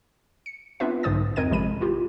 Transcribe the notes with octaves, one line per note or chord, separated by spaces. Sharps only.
C#7
B3 C4 D4 F4 B4 E5
B1 G#2 D3 C5 D#6 A6
F2 C4 A#4 D#5 G#6 D#7
A1 C3 F3 G#3 B5 D#7
E4 F4 G4